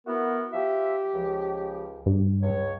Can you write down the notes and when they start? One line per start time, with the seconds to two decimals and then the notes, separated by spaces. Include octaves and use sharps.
0.07 B3 E4 F#4 A#4
0.52 F3 F4 G4 E5
1.14 C#2 F3
2.06 G2
2.42 C#2 C#5